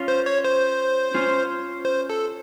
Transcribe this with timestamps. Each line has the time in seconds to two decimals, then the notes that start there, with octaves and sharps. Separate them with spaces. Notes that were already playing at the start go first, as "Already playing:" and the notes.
Already playing: C#4 F4
0.08 C5
0.26 C#5
0.44 C5
1.15 C#4 F4
1.85 C5
2.10 A4